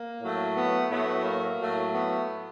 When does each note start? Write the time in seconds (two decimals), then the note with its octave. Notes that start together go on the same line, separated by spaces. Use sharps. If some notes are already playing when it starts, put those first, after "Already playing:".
Already playing: A#3
0.20 A2 F#3 A3
0.55 B3
0.90 A2 F#3 A3 B3
1.25 A#3
1.59 A2 F#3 A3
1.94 B3